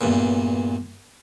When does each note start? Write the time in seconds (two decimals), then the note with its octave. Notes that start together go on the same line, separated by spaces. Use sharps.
0.01 E2 G2 A#2